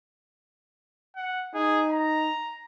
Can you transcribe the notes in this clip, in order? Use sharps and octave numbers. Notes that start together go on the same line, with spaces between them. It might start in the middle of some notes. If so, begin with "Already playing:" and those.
F#5
D#4 G#4
A#5